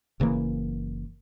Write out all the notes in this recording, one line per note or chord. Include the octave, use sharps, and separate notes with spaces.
F#1 C#3 E3 A#3